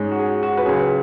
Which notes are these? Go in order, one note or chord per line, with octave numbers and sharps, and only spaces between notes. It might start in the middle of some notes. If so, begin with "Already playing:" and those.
Already playing: G#2 G#3 C#4
F#4
G#4
F#4
B4
C#2 C#3 F#3 G#4
B4